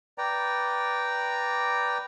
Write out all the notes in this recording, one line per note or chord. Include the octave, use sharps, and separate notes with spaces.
B4 D5 G5 A#5